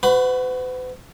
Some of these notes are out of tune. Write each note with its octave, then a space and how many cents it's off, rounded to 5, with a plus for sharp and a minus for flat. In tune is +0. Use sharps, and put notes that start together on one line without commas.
F#4 +0 B4 +45 B5 +15